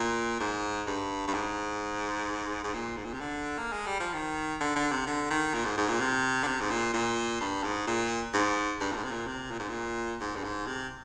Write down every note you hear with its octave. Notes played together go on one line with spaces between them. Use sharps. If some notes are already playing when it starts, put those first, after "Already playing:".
Already playing: A#2
G#2
G2
G2
G#2
G#2
A#2
G#2
A#2
C3
D3
A#3
G#3
G3
F3
D#3
D3
D3
C3
D3
D#3
A#2
G#2
G#2
A#2
C3
D3
C3
G#2
A#2
A#2
G2
G#2
A#2
G#2
G2
A#2
G#2
C3
A#2
C3
A#2
G#2
A#2
G#2
G2
G#2
C3